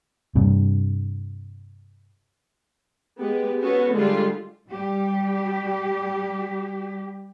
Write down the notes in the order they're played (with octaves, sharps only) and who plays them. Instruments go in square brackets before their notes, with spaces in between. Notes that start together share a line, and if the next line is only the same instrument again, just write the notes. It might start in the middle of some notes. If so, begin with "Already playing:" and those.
[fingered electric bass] G2 C3
[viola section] G#3 B3 G4
B3 C#4 F#4 A4
D3 G3 G#3 F4 G4 C6
[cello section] G3 G4